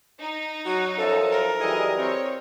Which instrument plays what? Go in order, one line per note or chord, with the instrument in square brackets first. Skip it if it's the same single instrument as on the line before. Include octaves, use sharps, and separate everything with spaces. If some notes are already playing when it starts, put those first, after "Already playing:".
[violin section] D#4
[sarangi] F#3 [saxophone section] F#4
[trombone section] F#2 F3 [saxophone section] A4
[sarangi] A#4
[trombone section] E3 F#3 G3 [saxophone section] G#4 A4 D#5
[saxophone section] C4 [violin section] C#5